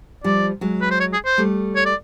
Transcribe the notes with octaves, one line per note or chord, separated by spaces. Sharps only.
F3 G3 D5
F#3 G#3
B4
C5
C#5
G#4
C5
G3 A3
C#5
D5